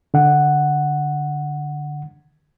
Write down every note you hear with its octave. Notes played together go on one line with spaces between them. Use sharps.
D3 F#5